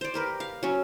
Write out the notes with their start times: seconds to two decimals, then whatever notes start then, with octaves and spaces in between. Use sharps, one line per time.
0.01 C5 D5
0.14 G4 A#4 B4
0.40 F5
0.63 F#3 C#4